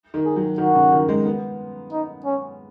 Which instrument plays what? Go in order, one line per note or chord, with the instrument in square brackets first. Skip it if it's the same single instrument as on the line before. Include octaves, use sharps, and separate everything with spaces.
[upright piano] D#3
[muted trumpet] G#4
[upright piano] F#3
[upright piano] D#3 [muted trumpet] F#4
[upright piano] C#3
D#3
G#3
B3
[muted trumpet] D#4
C#4